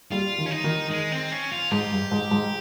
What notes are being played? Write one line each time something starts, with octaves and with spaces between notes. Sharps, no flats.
G3 F4
D#3
C#4
D#4
D#3
G#3
C4
C#4
F4
G#2 G4
G2
G#2
G#2